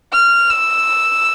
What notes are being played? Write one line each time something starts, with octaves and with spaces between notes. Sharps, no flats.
F6
E6